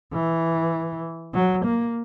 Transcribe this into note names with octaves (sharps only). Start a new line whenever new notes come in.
E3
F#3
A#3